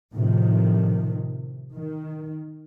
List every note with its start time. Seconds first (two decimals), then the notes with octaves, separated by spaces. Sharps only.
0.13 A2 C3 D#3 F3
1.74 D#3